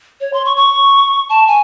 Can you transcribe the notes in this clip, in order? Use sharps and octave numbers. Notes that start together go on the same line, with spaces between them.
C#5
C6
C#6
C#6
A5
G#5